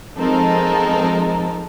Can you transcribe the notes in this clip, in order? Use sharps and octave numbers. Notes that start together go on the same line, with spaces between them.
F3 G#3 C4 D#4 A4 A#4